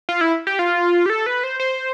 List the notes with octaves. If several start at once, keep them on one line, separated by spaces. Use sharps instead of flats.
F4
E4
G4
F4
G4
A4
B4
C5
C5